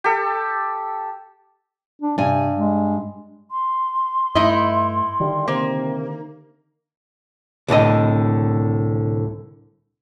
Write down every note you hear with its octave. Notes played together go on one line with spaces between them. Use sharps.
G4 A4
D4
G2 C3 G#5
G#3
C6
G2 A3 D#4 E4 D#5
D3 D#3 G3
C3 A#3
C2 A2 D3 D#5